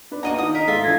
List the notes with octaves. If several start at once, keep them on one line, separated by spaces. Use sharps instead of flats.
D4 B4
A#3 D4 F#4 D#5 F#5 A#5
D#3 D#6
A#4 D#5 B6
G#2 F4 A4 E5
E3 D4 G#6 A#6